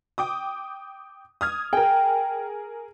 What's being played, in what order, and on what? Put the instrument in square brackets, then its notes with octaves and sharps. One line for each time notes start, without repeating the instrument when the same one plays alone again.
[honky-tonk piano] G5 D6 D#6
D#6 F6 G#6
[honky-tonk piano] G#4 A#4 [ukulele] G5